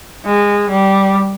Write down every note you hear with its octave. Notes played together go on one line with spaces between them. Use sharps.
G#3
G3